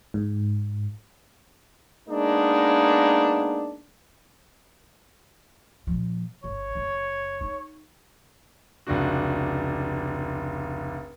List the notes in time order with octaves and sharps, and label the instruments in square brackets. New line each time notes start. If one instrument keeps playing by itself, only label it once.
[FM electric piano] G#2
[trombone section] G#3 A#3 B3 D4 D#4
[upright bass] A#2 F3
[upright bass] G1 [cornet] C#5
[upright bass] F#1
D#4
[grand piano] F1 C#2 D4 F#4